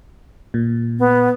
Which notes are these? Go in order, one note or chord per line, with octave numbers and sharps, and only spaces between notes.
A#2
B3